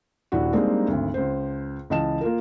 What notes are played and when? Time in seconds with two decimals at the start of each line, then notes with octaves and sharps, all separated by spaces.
0.32 D#1 D4 E4 F#4
0.53 G3 G#3 A#3 C4 D4 D#4
0.88 G#1 D2
1.14 C#2 C5
1.90 C#2 E3 D#5 A5 E7
2.21 A#3 F4 A#4